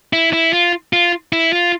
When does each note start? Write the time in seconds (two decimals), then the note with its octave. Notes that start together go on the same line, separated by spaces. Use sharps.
0.13 E4
0.33 E4
0.53 F4
0.93 F4
1.32 E4
1.53 F4